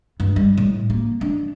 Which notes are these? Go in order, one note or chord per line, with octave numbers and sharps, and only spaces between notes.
G2
G3
A2
A#3
D4